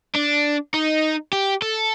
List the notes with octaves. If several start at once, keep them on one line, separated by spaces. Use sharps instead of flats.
D4
D#4
G4
A4